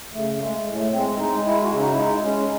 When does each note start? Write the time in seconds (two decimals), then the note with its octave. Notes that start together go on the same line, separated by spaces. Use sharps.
0.14 C#3 A3
0.40 G#3 A3
0.66 A2
0.76 A3
0.92 G#3 C4
1.19 G#3 D#4
1.45 G#3 E4
1.63 F#4
1.71 C#3
1.79 D#4
1.91 E4
1.97 G#3 D#4
2.23 G#3 C#4